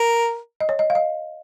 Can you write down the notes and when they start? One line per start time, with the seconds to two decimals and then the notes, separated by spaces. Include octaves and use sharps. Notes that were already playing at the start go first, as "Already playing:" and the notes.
Already playing: A#4
0.60 D#5
0.69 C#5
0.79 D#5
0.90 F5
0.95 D#5